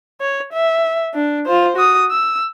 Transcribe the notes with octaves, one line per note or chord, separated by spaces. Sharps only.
C#5
E5
D4
F4 C5
F#4 D#6
E6